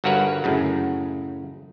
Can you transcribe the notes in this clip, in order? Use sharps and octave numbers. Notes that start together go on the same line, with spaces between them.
G1 G2 F#4 A#4 B4 C#5
F#2 A2 C#3